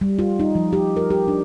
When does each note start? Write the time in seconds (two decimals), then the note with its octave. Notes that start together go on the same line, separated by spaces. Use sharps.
0.01 G3
0.19 F4
0.40 D#4
0.55 F3
0.73 G4
0.97 A#4
1.11 G4
1.28 D4